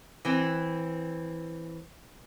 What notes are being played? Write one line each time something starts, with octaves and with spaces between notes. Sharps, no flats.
E3 C4